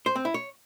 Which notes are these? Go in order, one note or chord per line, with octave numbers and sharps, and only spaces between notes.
C5
C4
E4
C#5